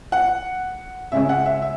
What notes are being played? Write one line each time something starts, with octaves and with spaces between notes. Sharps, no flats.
F#5
C#3 G#3 C#4 E5
F#5
E5
E5